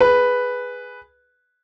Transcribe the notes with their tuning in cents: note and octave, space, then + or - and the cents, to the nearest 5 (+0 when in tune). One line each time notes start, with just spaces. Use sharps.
G#4 +0 B4 +0